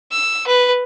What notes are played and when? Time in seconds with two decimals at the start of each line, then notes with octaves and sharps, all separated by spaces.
0.12 E6
0.47 B4